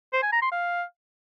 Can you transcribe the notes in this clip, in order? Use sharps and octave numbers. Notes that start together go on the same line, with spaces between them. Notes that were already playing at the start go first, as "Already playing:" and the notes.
C5
G#5
A#5
C6
F5